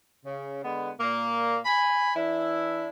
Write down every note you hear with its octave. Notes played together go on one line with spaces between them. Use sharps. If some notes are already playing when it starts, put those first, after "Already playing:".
C#3
D3 G#3 B3
A#2 A#3
G#5 B5
E3 D4 E4